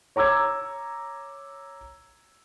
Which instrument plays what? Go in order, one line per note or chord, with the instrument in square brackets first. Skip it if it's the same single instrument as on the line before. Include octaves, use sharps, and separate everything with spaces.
[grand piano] C#5 A#5 D6 E6 G#6